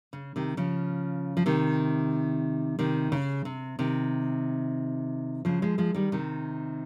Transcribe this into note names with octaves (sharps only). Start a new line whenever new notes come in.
C#3
C3 D#3
C#3 F3
F3
C3 D#3
C3 D#3
C#3
C3
C3 D#3
C#3 F3
F3 G#3
F3 G#3
D#3 G3
C3 D#3